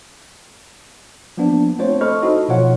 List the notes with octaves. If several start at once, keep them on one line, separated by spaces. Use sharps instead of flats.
F3 A#3 B3 D4
A3 C4 F4 C5 C#5
A4 C5 D#5 B5 C#6 F6
D#4 E4 F#4 A4 D#5
B2 F3 F4 C#5 F#5